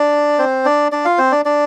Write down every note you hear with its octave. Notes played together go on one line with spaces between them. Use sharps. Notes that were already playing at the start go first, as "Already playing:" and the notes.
Already playing: D4 D5
C4 C5
D4 D5
D4 D5
F4 F5
C4 C5
D4 D5
D4 D5